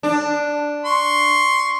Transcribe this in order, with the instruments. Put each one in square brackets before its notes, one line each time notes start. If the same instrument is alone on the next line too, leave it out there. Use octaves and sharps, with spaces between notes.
[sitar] D4
[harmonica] C6 C#6